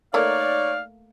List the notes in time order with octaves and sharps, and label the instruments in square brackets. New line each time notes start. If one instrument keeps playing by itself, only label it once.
[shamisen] A3 A#3 [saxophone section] D#4 D5 [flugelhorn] C#5 [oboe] F5